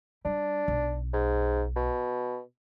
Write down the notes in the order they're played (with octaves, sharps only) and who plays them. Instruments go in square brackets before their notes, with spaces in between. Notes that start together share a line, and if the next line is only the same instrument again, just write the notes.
[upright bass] G3 [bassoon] D4
[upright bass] B1
[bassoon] G#2
B2